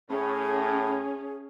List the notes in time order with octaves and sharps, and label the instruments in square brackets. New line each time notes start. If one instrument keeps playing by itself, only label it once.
[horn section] A2 [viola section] C#4 [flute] G#4